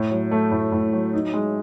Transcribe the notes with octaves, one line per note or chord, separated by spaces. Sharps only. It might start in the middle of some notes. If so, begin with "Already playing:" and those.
Already playing: A2
F#3
A3
A2
A2
F#3
D#4
G#3